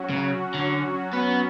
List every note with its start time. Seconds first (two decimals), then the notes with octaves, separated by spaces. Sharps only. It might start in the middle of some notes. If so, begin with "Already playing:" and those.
Already playing: F#3 C#4 F#4
0.10 C#3
0.54 D3
1.13 B3